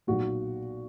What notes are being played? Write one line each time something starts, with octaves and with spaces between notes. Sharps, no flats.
B1 A#2 A#3 F#4